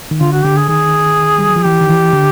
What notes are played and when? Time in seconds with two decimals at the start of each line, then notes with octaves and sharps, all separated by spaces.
0.11 D#3
0.21 D3 F4
0.33 F#4
0.45 D3 G4
0.57 G#4
0.69 D#3 G#4
1.38 G3
1.47 F#3
1.56 F3
1.64 E3 G4
1.81 D#3
1.89 E3
2.13 D3